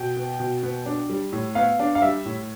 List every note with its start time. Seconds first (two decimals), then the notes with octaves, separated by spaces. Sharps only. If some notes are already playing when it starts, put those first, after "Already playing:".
Already playing: B2 G5
0.17 B3
0.40 B2
0.63 B3
0.86 D4
1.10 G3
1.33 A2
1.55 B3 F5
1.80 D4
1.95 F5
2.02 G3 E5
2.25 A2